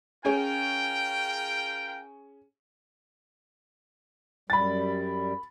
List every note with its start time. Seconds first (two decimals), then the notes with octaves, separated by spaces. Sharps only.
0.25 C#4 F4 G#4 A#4 C#5 G5
4.50 F#2 G3 B5 A6